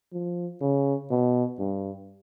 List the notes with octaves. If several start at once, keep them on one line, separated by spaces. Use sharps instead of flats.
F3
C#3
B2
G2